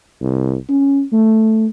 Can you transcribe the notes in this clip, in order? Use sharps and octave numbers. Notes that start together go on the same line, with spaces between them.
C2
C#4
A3